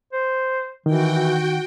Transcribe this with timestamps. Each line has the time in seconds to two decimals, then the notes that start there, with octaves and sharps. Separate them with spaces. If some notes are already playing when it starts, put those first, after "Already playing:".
0.13 C5
0.86 D#3 E3 F#4 G5